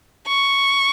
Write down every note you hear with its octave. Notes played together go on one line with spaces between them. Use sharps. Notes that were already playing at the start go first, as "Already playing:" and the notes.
C#6